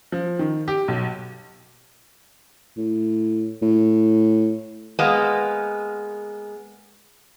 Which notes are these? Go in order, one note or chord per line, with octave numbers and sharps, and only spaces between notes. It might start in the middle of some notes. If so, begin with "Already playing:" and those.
F3
D#3
G4
B1
A2
A2
G#3 A#3 B3